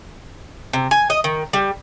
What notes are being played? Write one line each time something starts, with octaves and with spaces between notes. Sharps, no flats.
C3
G#5
D#5
D#3
G3